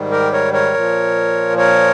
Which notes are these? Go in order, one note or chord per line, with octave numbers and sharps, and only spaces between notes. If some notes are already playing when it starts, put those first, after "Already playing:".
Already playing: G#2 D#3 G3
G4 A#4
A#4 C#5
A#4 C#5
A#2 F3
A#4 C#5